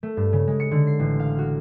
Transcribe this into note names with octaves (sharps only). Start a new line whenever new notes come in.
A3
G2
C#3
G#3
C#7
D3
C7
A1
F5
F#4